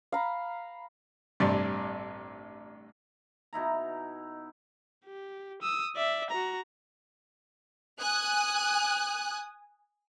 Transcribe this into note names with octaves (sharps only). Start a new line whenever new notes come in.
F5 A#5 B5
A1 G2 C3 D5
B2 D#4 E4 A#5
G4
D#6 E6
D5 E5
F#4 A#5
G#5 D#6 F#6